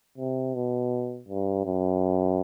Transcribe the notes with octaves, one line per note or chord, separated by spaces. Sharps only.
C3
B2
G2
F#2